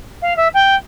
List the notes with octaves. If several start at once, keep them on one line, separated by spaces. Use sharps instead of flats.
F5
E5
G5